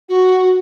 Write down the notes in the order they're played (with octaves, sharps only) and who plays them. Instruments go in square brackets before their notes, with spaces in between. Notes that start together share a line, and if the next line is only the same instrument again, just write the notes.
[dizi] F#4